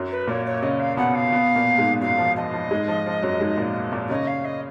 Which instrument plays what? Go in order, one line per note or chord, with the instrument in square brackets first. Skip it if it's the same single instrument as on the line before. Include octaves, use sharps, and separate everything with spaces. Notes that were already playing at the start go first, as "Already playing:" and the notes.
Already playing: [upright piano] F#2 F#3
[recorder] B4
[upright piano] A#2 A#3 [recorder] C#5
[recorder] C#5
[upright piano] C#3 C#4 [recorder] D#5
[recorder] F5
[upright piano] B2 B3 [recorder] F#5
[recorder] F5
[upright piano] B2 B3
A#2 A#3
G#2 G#3
[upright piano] F#2 F#3 [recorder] F5
[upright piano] F3
[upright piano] F3 [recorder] D#5
[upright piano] F3
G#2 G#3
F3
F3
F#2 F#3
G#2 G#3
A#2 A#3
A#2 A#3
[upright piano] C#3 C#4 [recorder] D#5
[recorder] F5
D#5